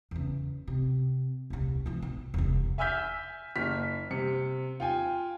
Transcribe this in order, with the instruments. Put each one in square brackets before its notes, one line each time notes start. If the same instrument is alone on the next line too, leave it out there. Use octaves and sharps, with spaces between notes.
[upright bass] E2 C#3
C3
D#1 C2
E3 F3
B1
E1 C2
[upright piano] E5 G#5 E6 F6 G6 B6
F#1 F6 B6
C3 C#7
F4 G5 G#5